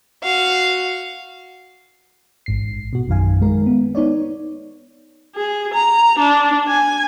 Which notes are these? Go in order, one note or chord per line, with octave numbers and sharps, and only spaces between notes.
F#4 F5
A1 G#2 C7
B2 F#4
A#1 F#2 D#3 F5 G#5
D#3 G#3 A#4
B3
B3 D#4 C#5 D5
G#4
A#5
D4
G#5